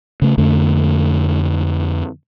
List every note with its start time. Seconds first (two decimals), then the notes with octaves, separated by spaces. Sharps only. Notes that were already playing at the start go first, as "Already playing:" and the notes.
0.22 C#3 A3
0.38 F2 D3 A3